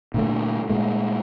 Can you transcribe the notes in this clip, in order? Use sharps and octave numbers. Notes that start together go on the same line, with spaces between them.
A#2 D3 A3
A#2 G#3 A3